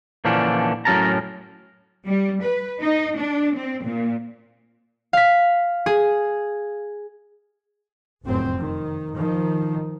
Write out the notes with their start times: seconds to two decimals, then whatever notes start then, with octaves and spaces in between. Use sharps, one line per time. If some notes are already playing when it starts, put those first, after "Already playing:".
0.25 A#2 D3 E3 F3 C#4 D4
0.85 A2 F#3 C#4 A#4 A5 A#5
2.06 G3
2.44 B4
2.81 D#4
3.17 D4
3.56 C4
3.85 A#2
5.13 F5 B6
5.86 G#4
8.24 F1 F#2 A2 C4
8.56 D#3
9.13 D#3 F3